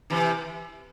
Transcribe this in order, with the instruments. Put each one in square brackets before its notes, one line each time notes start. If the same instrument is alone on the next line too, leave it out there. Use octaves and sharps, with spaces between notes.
[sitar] C3 E3